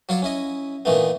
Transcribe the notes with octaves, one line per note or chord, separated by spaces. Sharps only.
F#3 F4 C#5 D5
C#4 E4 D#5
A#2 D#3 E3 A3 B3